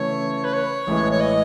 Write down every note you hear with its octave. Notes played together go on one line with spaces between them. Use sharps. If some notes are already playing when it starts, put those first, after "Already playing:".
Already playing: C#3 E3 A3 C#5
B4
C#5
A1 A2 E3 G#3
C#5
D#5